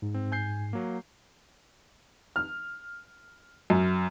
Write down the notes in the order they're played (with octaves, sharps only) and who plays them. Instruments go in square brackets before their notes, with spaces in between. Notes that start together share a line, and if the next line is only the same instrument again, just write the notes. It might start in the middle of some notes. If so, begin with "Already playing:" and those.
[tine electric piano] G#2
[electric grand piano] C4
G#5 G6 C7
F#3 A#3
[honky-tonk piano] F6
F#2